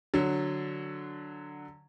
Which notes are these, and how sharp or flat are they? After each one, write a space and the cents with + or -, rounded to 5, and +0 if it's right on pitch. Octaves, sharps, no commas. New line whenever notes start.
D3 +0 F#3 -10